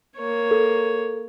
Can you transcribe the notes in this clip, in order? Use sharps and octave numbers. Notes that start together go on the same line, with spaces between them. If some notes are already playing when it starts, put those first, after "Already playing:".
A#3 C#5
A4